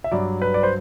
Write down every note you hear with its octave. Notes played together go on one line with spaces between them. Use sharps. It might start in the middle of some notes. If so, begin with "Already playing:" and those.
E5
G2 F#3 D5
B4
D5
C5